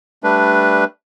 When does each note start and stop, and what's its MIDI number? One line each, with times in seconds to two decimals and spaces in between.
0.23 0.84 55
0.23 0.84 57
0.23 0.84 62
0.23 0.84 71